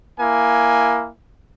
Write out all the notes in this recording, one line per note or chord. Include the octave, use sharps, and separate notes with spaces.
A#3 E4 G#5